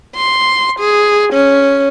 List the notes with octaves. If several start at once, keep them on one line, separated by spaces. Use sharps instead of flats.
C6
G#4
C#4